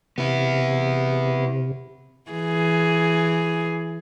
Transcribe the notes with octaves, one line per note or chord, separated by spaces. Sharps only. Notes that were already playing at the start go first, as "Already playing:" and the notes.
C3 B3 E4
E3 G#4